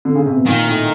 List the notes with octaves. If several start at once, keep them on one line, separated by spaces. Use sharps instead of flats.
D3
C#3
C3
B2
A#2 D#3
A2